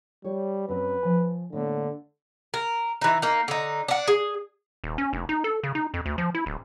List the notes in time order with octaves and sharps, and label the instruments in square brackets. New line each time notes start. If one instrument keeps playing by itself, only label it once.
[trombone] G3 [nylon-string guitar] G4 C#5
[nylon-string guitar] F#2 F#3 C4 [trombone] B4
[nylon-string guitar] F3 G#5
[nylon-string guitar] A2 A#3 B3 [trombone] D3
[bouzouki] A#4
E3 D#4
A#3 D#4
D3 D#4
D4 F#5
G#4
[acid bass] D#1
C#4
F1
D#4
A4
C#3
D#4
F2
D2
F3
E4
D1